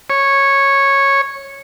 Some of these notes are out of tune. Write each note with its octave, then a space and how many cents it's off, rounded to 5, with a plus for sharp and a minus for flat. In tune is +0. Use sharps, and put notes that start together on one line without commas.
C#5 -10